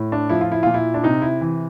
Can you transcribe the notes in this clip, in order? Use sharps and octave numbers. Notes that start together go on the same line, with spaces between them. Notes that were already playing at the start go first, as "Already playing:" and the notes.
Already playing: A2
D4
F3 E4
F4
E4
A#2 F4
E4
D4
C3 D#4
E4
E3